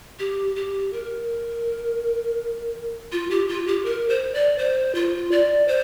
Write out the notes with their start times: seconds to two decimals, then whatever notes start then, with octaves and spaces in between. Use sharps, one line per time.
0.19 G4
0.56 G4
0.93 A#4
3.12 F4
3.31 G4
3.49 F4
3.67 G4
3.85 A#4
4.09 C5
4.34 D5
4.58 C5
4.95 F4
5.32 D5
5.68 C5